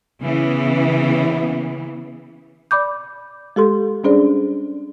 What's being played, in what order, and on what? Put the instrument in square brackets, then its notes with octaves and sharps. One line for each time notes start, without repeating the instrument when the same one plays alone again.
[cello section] C#3 E3 B3
[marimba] D5 B5 D6 G6
G#3 G4 A4 C6
G3 C#4 D4 G#4 C5 D5